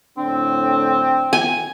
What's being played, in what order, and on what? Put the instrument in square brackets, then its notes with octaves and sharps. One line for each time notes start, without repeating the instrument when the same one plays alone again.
[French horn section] A2 D3 D4 [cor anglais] C4
[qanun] G#5